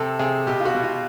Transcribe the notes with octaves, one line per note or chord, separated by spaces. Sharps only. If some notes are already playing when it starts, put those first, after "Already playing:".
Already playing: C3 A4
C3 G#4
B2 G4
F4
F#4
B2
F4